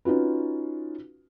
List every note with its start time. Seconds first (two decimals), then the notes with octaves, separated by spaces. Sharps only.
0.05 C#4 D#4 F4 F#4 B4